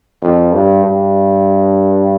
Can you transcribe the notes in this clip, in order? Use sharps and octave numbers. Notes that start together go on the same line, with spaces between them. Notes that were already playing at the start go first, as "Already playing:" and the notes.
F2
G2
G2